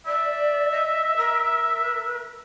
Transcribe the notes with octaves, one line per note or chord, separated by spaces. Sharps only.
D5 E5
D#5
A#4